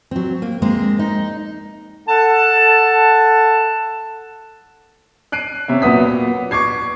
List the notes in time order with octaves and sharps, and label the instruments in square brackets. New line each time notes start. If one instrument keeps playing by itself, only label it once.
[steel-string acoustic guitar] F#3 C4
A#3
G#3 A#3 C4
D#4
[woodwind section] A4 F#5 A5
[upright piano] F#6 C7 D7 D#7
C3 C#4 E5
A#2 F#3 B3 D#6 B6
C#6 D6 G#6 C7